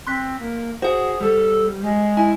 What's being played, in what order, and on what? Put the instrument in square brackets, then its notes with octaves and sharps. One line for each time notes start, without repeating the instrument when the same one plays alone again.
[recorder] C4 [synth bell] C6 F#6 B6
[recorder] A#3
[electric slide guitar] F#4 [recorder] G#4 [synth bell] C5 F#5
[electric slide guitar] G3 [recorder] A4
[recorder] G#3
[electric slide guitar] E4 [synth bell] G#5